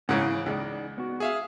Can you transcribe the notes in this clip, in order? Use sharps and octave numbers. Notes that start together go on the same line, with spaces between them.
G#2 C#3 E3 C#4 C#5 F#5
C#2 D#4 G#4 D5
B3 F#4
G#4 E5 F5